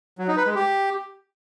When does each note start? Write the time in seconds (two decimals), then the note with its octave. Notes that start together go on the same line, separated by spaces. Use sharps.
0.19 F#3
0.28 D#4
0.37 B4
0.46 G#3
0.55 G4